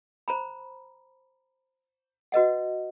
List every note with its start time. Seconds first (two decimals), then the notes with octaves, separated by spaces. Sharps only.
0.28 C5 A#5 B5
2.32 F#4 B4 D#5 F#5